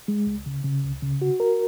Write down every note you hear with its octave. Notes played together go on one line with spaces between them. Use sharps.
G#3
C#2
C#3
C#3
C#2
C#3
F#4
A#4